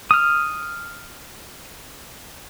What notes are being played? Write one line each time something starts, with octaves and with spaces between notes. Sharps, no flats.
D#6 F6